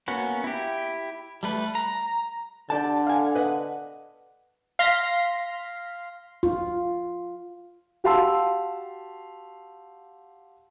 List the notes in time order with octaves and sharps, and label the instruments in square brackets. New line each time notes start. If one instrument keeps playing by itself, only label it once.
[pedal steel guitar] A#3 B3 C#4 F#4
E4 G4
G3 A3 B4
A#5
[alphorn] D3 [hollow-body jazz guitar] G4 D5 A5
[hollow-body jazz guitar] F5 G#5
B4 D#5 F#5
[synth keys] F5 C6 A#6 B6
[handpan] F4
[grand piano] F#4 G4 F5 A5 C6 E6